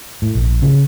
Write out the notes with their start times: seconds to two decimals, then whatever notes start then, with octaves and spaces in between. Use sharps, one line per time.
0.22 A2
0.35 A#1
0.62 C#3